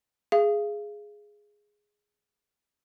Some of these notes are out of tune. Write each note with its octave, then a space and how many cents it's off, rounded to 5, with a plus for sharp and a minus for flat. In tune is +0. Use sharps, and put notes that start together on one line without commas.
G#4 +0 F5 -30